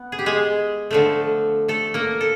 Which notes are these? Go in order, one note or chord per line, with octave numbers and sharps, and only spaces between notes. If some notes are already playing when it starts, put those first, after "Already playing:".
Already playing: B3
G#4
G4
G#3 G#4
D3 F3 A3
A3 A4
A#3 A#4
A4